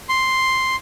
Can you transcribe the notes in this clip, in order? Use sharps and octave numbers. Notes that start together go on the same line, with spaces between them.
C6